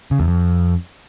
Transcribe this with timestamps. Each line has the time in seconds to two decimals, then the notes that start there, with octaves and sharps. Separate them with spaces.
0.11 C#3
0.20 E2
0.28 F2